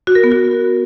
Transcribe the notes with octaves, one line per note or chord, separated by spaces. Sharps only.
F#4
A#4
B3
F#4